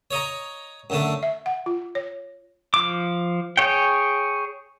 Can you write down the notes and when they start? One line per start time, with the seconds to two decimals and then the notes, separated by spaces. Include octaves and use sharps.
0.11 C#5 D#5 A#5
0.90 F#2 D3 A3
1.23 E5
1.46 F#5
1.66 F4
1.95 C#5
2.74 F3 D6
3.57 G#4 C#5 G5